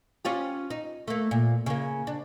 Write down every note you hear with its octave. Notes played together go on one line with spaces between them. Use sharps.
C#4 F4 G4
D#4
A3 A#3
A#2
C#3 A#3
D4